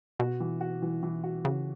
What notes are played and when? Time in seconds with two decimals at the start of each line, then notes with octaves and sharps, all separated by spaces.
0.19 B2 F#4
0.40 E3
0.61 F#4
0.82 E3
1.03 E3
1.24 F#4
1.45 C#3 F#4